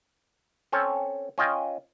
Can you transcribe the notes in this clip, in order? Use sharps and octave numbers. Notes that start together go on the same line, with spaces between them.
C4 C#4 A4 C#5
C#4 F4 D#5 G5